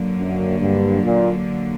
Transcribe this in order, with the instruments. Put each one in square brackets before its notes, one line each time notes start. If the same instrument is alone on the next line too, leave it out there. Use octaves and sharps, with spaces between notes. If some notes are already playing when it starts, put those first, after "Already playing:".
Already playing: [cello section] D3 F#3 A#3
[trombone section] F#2
G2
A#2